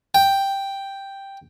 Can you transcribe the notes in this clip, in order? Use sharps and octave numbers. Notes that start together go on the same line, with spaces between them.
G5